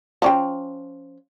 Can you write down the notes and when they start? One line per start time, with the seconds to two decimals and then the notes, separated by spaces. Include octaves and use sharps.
0.22 F3 C#4 G5